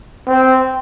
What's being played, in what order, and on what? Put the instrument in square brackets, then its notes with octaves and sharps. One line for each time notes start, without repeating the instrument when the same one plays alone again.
[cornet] C4